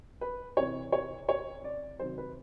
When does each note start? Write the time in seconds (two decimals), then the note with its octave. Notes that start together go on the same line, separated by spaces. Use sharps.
0.21 B4
0.57 C3 E3 C#5
0.92 C#5
1.29 C#5
1.64 D5
1.99 C3 D#3 F#3 C5
2.18 B4